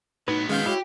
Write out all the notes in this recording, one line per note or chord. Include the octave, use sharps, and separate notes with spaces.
A2 F#3 B3 D#4 B4
D#3 G#3 C#4 F5 G6
E4 F#4 G4 C#5